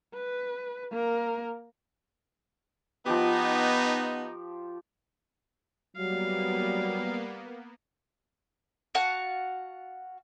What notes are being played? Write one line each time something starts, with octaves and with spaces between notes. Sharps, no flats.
B4
A#3 A#4
F3 B3 D#4 G4
F#3 G3 A#3 B3 F5
F#4 F5 F#5 A5